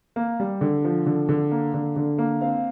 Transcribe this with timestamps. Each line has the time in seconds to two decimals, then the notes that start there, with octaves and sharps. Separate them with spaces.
0.16 A#3
0.40 G3
0.61 D3
0.85 F3
1.06 D3
1.29 D3
1.51 A#3
1.74 D3
1.96 D3
2.18 A#3
2.41 C4 F5